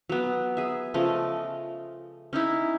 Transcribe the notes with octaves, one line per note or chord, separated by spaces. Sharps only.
F#3 B3
G#4 E5
C#3 F3 A3 D#5
C#4 D#4 E4